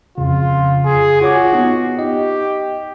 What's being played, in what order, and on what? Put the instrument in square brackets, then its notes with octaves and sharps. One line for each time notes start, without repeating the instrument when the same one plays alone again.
[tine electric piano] F2 C#3 [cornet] F4
[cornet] G#4
[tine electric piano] F4 C#5 D6 [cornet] F#4
[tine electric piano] B3 D#4 F4
[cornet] G4 [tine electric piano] D#5